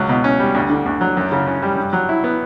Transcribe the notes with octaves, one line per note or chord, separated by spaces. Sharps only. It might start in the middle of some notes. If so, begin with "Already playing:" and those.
Already playing: C#2 F#3
B2
C#4
G3
D2
D3
D2
F#3
F#2
C#3
C#4
G3
G2
F#3
E4
B3